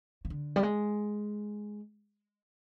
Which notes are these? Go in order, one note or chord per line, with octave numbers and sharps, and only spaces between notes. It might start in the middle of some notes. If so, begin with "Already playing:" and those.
C#3
D3
G3
G#3